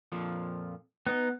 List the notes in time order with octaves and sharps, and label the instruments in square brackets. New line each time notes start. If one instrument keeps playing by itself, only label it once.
[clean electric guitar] F2 A#2 F3
[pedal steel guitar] B3 [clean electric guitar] D#4